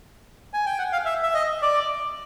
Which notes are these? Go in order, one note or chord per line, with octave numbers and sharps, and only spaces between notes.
G#5
G5
F#5
F5
E5
E5
D#5
D5